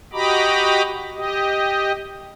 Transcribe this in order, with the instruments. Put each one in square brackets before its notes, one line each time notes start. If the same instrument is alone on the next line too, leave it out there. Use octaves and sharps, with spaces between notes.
[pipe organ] F#4 G4 D#5 A#5 B5 D6
G4 D#5